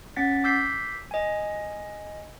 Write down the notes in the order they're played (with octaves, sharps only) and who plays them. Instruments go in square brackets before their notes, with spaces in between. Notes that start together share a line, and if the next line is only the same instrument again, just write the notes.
[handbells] C#4 F#5 A6 B6
D6 E6 G6 B6 C7
D#5 G#5